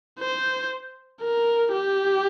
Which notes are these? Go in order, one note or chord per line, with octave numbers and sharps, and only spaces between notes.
C5
A#4
G4